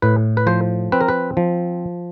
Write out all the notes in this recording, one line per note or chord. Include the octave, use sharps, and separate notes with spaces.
A2 B4
B4
F3 C5
C4 B4
A#4
B4
F3